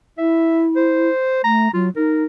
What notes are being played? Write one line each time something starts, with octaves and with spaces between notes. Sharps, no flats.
E4 E5
C5
A3 A#5
F#3 F4
D#4 A#4